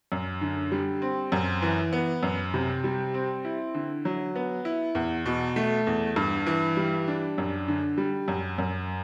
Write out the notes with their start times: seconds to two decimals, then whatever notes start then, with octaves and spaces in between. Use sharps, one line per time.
0.12 F#2
0.41 D3
0.72 G3
1.02 C4
1.32 F#2
1.62 E3
1.93 B3
2.23 F#2
2.54 C3
2.84 G3
3.14 C4
3.45 E4
3.74 D3
4.05 F#3
4.35 B3
4.65 E4
4.95 E2
5.26 B2
5.56 A3
5.87 E2
6.16 G2
6.46 E3
6.77 G3
7.08 D4
7.38 F#2
7.68 D3
7.98 G3
8.28 F#2
8.58 F#2